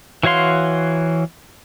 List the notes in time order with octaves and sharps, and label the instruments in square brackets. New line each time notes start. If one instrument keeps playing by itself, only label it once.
[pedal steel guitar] E3 F#4 C#5 F5 C6